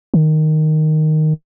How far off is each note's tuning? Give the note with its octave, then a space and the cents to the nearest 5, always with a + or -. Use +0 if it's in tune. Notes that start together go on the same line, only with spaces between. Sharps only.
D#3 -5